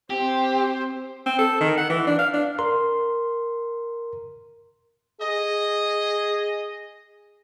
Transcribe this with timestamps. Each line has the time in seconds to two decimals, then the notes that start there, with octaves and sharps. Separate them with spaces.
0.10 C4 G4 C5
1.26 C4
1.39 A4
1.61 D#3
1.77 F#5
1.90 E3
2.07 D4
2.19 F5
2.34 D4
2.59 A#4 C6
5.21 G#4 D#5